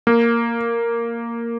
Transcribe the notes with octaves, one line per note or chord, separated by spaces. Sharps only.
A#3